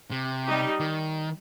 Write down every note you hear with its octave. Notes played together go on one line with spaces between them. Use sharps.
C3
G3 D#4 G4
D#3